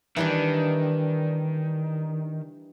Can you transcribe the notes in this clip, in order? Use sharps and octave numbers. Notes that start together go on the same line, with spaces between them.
D#3 E3 G3 D4